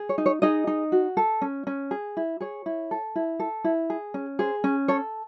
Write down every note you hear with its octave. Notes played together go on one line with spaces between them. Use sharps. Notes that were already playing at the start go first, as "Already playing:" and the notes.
Already playing: G#4
C#5
D#4
C#5
D#4 G#4 D#5
D#4
F#4
A4
C#4
C#4
G#4
E4
G#4 C#5
E4
A4
E4
A4
E4
G#4
C#4
G#4 C5
C#4
A4 C#5